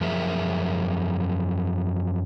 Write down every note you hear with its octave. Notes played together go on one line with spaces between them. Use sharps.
F#2 F3 G#4 A#4 E5